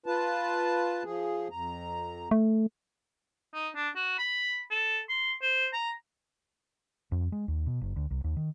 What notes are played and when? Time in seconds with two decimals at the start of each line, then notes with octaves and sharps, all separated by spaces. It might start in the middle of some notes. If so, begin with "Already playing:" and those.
0.06 F4 B4 A5
1.04 F3 G#4
1.50 F2 A#5
2.31 A3
3.54 D#4
3.76 D4
3.96 F#4
4.18 B5
4.71 A4
5.09 C6
5.42 C5
5.73 A#5
7.12 F2
7.32 G#3
7.48 D#2
7.66 B2
7.81 F#1
7.96 D2
8.11 C2
8.24 D#2
8.37 D#3